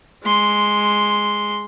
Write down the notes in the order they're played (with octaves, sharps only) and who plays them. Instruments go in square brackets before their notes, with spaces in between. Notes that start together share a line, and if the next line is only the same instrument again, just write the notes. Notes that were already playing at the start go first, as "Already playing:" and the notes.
[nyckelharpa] G#3 C6